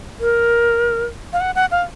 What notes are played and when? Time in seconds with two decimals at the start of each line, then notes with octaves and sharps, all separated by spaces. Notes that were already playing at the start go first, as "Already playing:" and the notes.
0.20 A#4
1.33 F5
1.41 F#5
1.55 F#5
1.71 F5